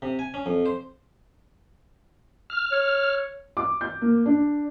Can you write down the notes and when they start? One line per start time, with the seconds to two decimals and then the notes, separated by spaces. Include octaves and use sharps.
0.02 C3
0.19 G#5
0.34 C#4
0.46 F2
0.66 C5
2.50 F6
2.71 C#5
3.57 D6
3.81 G6
4.01 A#3
4.26 D4